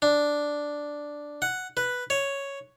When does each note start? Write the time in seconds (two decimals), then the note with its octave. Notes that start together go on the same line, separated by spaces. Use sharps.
0.02 D4
1.42 F#5
1.77 B4
2.10 C#5